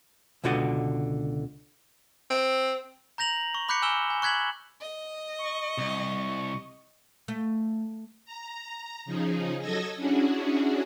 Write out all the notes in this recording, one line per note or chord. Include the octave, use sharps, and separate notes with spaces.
C#2 B2 D3 F#4 D5 D#5
C4
A#5 G6 A#6 F7 F#7
C#6
B5 D6 F#6 G6 B6 C#7
G#5 E6 F6 E7 G7
G#5
C#6 F#6 G#6 B6 F#7
D#5
C#6
C2
A3
A#5
C#3 F3 D#4 G#4
F#3 A4 D#5 E6 G#6 A#6
C#4 D4 E4 F#4 G#4